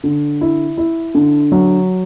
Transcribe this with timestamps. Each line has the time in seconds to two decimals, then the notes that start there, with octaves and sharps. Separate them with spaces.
0.04 D3
0.41 E4
0.78 E4
1.15 D3
1.52 F#3